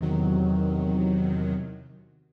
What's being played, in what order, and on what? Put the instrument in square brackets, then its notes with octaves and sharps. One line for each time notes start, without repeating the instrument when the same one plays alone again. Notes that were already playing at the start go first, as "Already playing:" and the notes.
[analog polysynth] E2 C3 D#3 F#3